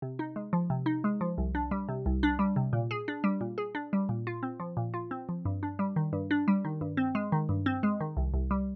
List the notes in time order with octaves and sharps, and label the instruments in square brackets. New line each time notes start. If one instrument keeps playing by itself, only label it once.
[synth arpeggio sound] C3
D#4
G#3
F3
C3
D#4
G#3
F3
C2
D4
G3
C3
C2
D4
G3
C3
A#2
G#4
D4
G3
A#2
G#4
D4
G3
A#2
F4
C4
F3
A#2
F4
C4
F3
G2
D4
G3
D#3
G2
D4
G3
D#3
G2
C4
G#3
D#3
G2
C4
G#3
D#3
C2
C2
G3